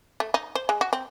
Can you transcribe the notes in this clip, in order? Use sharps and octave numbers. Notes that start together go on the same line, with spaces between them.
A3
D#4
C5
G#3
F#4
C4